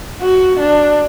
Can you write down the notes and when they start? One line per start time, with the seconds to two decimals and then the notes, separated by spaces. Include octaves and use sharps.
0.22 F#4
0.60 D4